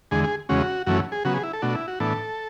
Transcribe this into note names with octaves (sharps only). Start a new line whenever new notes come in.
E2 D3 G#3 G#4
G#4
E2 C#3 G#3 C#4 F#4
F#2 E3 A3 C#4 F#4
G#4
C#3 F#3 B3 F#4
G#4
E4
A4
B2 A3 D4 F#4
E4
F#4
A2 E3 B3 D4 A4